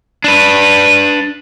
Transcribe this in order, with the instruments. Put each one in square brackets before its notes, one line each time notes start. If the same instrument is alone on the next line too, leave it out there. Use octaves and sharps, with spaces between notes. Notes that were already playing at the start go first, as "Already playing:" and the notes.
[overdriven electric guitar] D4 B4